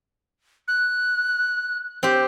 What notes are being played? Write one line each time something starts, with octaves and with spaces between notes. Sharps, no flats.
F#6
C4 G4